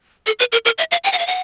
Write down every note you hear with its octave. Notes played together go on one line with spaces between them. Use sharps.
A4
B4
A#4
A#4
E5
F5
G5
F#5
F5
F#5